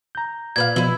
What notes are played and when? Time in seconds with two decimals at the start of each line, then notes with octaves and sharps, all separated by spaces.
0.15 A#5 G6
0.56 A#2 B4 F5 G#6
0.76 B2 F3 E4 B4